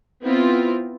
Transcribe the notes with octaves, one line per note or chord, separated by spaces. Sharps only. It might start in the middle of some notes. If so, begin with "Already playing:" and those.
B3 C4 E4 F4